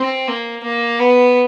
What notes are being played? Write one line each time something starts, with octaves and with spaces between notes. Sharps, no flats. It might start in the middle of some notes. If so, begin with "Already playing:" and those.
Already playing: C4
A#3
A#3
B3